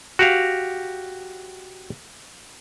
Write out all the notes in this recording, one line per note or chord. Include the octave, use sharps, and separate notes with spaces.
F#4 G4 F5